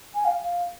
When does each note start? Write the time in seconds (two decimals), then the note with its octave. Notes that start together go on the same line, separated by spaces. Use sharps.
0.15 G#5
0.25 F5
0.42 F5